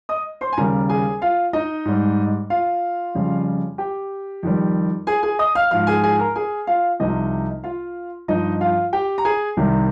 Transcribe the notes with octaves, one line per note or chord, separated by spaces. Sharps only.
D#5 D#6
C5 C6
G#5
D#2 C#3 G3 A#4 A#5
G#4 G#5
F4 F5
D#4 D#5
G#2 G3
F4 F5
F2 C#3 G3
G4 G5
F2 D#3 G3
G#4 G#5
G#4 G#5
D#5 D#6
F5 F6
G#2 F3 F5 F6
G#4 G#5
G#4 G#5
A#4 A#5
G#4 G#5
F4 F5
C2 C3 F3 D#4 D#5
F4 F5
G2 F3 D#4 D#5
F4 F5
G4 G5
A#5
G#4 G#5
C2 C3 D#3 G3